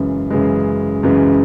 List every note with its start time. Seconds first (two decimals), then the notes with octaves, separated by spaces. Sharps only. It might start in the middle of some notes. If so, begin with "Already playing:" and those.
Already playing: F#2 C#3 E3 G#3
0.30 F#2 C#3 E3 G#3
1.03 F#2 C#3 E3 G#3